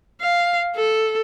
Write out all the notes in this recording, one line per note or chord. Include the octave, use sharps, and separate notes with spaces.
F5
A4